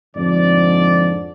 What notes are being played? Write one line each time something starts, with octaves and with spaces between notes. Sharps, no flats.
F2 G#2 D3 D5